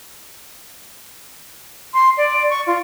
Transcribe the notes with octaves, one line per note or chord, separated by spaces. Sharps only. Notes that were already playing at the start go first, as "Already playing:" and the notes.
C6
D5
C#6
F4